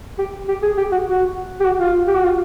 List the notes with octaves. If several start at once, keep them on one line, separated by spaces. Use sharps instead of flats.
G4
G4
G#4
G4
F#4
F#4
G4
F#4
F4
G4
F#4
F4